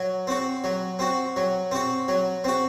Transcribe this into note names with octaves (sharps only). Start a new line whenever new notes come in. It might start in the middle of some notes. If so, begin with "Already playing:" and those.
Already playing: F#3
C4 F#4
F#3
C4 F#4
F#3
C4 F#4
F#3
C4 F#4